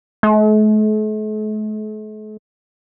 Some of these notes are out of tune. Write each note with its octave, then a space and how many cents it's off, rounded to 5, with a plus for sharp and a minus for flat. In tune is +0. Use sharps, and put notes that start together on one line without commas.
A3 -45